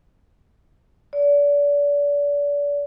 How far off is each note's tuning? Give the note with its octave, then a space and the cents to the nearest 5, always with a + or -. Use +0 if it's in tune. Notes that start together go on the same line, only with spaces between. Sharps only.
D5 -35